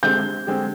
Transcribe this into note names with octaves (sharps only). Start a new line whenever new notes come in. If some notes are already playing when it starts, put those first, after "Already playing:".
D3 G#3 C4 G4 G6
D3 G#3 C4 G4